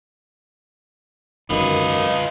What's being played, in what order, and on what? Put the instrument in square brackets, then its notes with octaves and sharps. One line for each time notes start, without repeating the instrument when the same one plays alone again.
[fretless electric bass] F#2 D#3 [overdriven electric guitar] F4 B4 [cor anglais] D#5